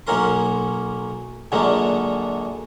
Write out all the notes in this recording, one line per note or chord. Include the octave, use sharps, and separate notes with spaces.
B1 F#3 A#3 C#4 A#4 C6
F#2 A#2 D3 F#3 G#3 A#3